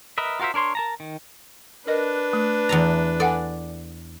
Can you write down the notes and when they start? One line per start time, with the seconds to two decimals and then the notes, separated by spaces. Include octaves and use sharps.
0.18 A#4 B4 D#5 E5
0.40 F4 F#4 A#4 C5 E5
0.54 D4 A#4 C#5 C6
0.75 A#4 A5 A#5
1.00 D#3
1.87 D4 A#4 B4 D#5
2.33 A3
2.69 E2 A4 A#5
3.20 A4 D5 F#5 G#5